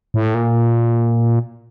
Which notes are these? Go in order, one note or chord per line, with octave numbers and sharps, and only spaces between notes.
A2
A#2